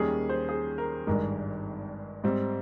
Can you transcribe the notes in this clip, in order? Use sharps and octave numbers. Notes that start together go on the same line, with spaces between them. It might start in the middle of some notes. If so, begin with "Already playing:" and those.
Already playing: D#2 D#3 G3 C#4 G#4
C5
G#4
A#4
G#1 G2 D#3 G#3 A#4
G#2 G3 C4